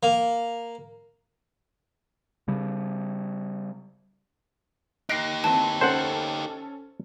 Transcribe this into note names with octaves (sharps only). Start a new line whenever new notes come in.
A#3
C#3 G3
D#4 G4 F#6 A#6 C7 D7
E3 C4 A5
C#4 A4 C5 F#5